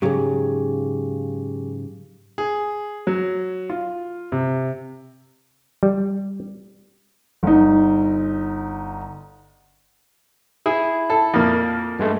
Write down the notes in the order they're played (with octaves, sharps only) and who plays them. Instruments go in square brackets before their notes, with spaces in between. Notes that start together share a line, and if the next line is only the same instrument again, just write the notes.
[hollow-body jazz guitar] G#2 C#3 F#3 [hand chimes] G4 G#4
[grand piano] G#4
F#3
F4
C3
[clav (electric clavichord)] G3
[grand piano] G1 D#4
[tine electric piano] E4 [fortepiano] G#4
[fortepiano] A4
F2 A#2 A#3
[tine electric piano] G2 G#3 A3